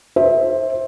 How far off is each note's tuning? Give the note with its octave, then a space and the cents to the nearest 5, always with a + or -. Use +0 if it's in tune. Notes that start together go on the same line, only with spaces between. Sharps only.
C5 +20 E5 -15